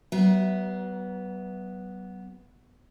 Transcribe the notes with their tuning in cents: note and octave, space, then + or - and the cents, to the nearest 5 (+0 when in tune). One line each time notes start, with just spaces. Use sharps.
F#3 +40 B3 -5 E5 +0